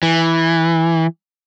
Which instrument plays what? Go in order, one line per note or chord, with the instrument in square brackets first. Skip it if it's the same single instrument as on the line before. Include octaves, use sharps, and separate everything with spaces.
[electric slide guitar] E3